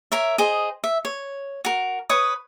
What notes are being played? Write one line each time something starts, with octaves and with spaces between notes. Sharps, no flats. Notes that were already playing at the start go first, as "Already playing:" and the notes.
A#4 C#5 E5
G#4 C5 D#5
E5
C#5
F#4 A#4
B4 C#5 C#6 D#6